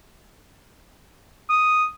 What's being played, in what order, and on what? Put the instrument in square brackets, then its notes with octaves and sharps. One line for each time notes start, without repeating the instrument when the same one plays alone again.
[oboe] D#6